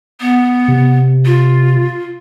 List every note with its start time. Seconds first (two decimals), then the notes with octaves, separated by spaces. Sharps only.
0.20 B3
0.68 C3
1.26 F4